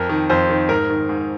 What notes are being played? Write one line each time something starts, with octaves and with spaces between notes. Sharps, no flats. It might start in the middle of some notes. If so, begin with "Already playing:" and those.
Already playing: F2 A#4
D#3
F2 C5
D#3
G#2 A#4
D#3
G#2